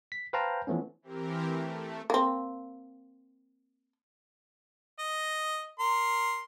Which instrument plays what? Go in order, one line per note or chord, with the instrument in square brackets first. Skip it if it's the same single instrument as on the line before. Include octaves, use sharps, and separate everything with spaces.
[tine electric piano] B6
B4 C5 F5 G5 A5 A#5
E3 F3 A3 B3 C#4
[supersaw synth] E3 C4 G4 A#4
A3
[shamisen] A#3 C4
[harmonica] D#5
A#4 C6